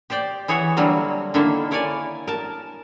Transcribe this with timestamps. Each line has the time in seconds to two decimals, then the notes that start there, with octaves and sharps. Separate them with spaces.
0.10 G4 C5 D5 G5
0.48 E3 G#4 C#5 E5 F#5
0.77 D3 F#3 G3 A#3 C4
1.34 D3 D#3 A#3 E4 F4 E5
1.71 E4 A#4 C#5 D5 G#5
2.27 A#4 A5